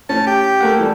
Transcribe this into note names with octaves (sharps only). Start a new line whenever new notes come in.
A2 C#4 A5
G4
A3 A#3 F#5
E3 G3 A4